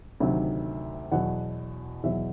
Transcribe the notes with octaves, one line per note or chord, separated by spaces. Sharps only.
D2 C3 D#3 F#3
E2 B2 F#3 F#5
E2 B2 F#3 E5